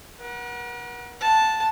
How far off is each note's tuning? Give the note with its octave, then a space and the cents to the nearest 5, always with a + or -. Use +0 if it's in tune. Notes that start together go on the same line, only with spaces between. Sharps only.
A#4 +45 F#5 +0
F#5 -20 A5 +0